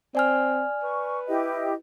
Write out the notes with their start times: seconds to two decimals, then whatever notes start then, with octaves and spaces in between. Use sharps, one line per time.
0.15 C4 D5 G#5 F6
0.83 B4 C#6
1.27 E4 G4 D#5